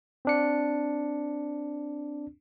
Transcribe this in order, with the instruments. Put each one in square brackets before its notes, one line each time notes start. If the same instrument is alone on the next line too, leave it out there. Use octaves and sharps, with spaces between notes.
[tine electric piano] C4 D4 C#7